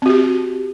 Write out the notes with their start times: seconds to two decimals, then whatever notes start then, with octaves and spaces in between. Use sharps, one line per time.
0.02 C4
0.06 F#4
0.09 G4